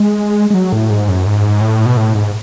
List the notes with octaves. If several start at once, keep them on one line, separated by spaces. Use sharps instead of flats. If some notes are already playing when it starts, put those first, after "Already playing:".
Already playing: G#3
G#3
F#3
A2
G#2
F#2
G#2
A2
B2
A2
G#2